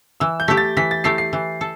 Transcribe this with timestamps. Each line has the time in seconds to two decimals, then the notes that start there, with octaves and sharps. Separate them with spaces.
0.20 E3 E6
0.40 G6
0.48 A3 E4 G4 B6
0.57 A6
0.77 E3 B6
0.91 A6
1.04 A3 E4 G4 C7
1.18 C7
1.33 E3
1.61 A4